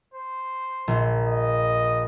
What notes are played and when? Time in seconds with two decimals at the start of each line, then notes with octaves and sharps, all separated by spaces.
0.14 C5
0.88 A#1
1.26 D#5